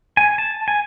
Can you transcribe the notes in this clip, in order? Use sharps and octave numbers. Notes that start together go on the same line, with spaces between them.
G#5
A5
G#5